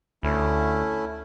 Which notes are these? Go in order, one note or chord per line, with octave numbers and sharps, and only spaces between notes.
D2 A3 C#4 E4